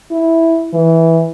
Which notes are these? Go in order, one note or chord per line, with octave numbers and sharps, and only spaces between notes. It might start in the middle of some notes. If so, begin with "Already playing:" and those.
E4
E3